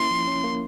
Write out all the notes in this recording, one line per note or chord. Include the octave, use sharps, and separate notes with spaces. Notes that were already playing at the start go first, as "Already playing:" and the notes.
Already playing: A#3 C#4 E4 C6
F3
C#4
A#3